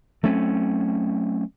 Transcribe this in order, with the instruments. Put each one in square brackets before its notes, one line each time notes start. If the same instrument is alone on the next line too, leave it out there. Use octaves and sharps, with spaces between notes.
[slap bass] F#3 A3 C4 C#4